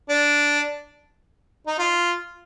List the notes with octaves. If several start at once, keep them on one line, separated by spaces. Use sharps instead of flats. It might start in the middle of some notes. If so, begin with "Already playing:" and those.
D4
D#4
F4